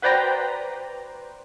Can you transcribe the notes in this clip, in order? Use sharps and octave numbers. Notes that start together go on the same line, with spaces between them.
F#4 B4 C5 D5 G5 A#5